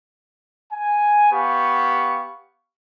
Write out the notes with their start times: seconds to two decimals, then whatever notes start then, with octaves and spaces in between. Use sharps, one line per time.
0.73 G#5
1.31 B3 G4 F5 C#6